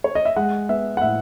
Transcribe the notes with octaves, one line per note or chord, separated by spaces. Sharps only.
C#5
D#5
E5
G#3 F#5
B3 E5
F#5
A2 E5